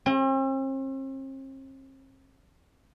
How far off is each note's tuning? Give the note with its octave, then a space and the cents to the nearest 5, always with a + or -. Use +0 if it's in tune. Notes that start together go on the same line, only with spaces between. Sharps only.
C4 +45